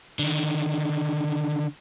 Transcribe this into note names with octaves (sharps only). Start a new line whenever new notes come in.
D3 D#3